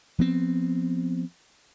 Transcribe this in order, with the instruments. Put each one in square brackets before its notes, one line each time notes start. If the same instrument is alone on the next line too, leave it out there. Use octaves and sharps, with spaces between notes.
[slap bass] F3 B3 C4